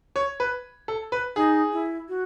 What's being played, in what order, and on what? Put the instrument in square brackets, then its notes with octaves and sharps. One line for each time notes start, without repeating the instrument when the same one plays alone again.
[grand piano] C#5
B4
A4
B4
[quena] D#4 [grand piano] G#4
[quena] E4
F#4